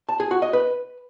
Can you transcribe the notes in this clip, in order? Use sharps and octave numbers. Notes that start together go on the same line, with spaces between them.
A5
G#4
F#4
D#5
B4